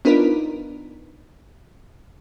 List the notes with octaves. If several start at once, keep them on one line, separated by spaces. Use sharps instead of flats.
B3 D4 D#4 F4 A#4 B4